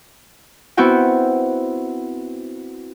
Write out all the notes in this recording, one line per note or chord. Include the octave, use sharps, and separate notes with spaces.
B3 C4 E4 F#4 G5